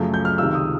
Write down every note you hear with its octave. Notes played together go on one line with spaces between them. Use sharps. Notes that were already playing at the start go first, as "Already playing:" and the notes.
Already playing: F#2 C#3 F3 A3
G6
F6
C#2 C3 D#3 E6
D#6